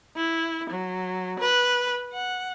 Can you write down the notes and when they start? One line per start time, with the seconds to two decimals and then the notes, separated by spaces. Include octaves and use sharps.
0.16 E4
0.70 F#3
1.39 B4
2.13 F#5